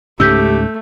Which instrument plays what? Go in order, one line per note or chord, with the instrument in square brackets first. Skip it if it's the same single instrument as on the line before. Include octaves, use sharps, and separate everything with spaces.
[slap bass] C#2 G#2 C#4 [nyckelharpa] A3 [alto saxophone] G4 [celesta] E6 G6 B6